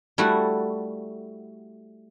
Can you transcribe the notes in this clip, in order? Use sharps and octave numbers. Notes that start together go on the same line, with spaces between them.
G3 A3 E4 F#4